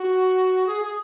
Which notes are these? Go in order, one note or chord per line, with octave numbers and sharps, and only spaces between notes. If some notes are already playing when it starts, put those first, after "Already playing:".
Already playing: F#4
G#4
G#4